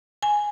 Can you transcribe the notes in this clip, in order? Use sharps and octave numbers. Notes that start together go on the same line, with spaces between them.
G#5